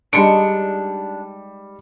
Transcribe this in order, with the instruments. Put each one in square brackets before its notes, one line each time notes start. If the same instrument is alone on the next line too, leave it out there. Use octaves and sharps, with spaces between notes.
[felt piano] G3 C#7 D7 [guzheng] G#3 D#4 [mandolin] D4